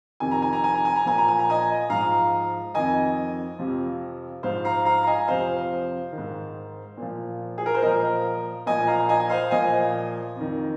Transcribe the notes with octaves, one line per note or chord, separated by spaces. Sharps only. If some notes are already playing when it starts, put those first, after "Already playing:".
F2 C3 D#3 G#5
A#5
G#5
A#5
G#5
A#5
G#5
A#5
A#2 F3 G#5
A#5
G#5
A#5
D#5 G#5
G#2 F3 F5 A#5
F2 D#3 D#5 G#5
F2 C3 F3
G#2 F3 C5 F5
F5 A#5
F5 A#5
A#5
D#5 G#5
F2 C3 F3 C5 F5
D#3
G#2
A#2 F3
G#4
A#4
C5
A#2 F3 A#4 D#5
A#2 F3 D#5 G#5
F5 A#5
D#5 G#5
G#5
C5 F5
A#2 F3 D#5 G#5
F2 D#3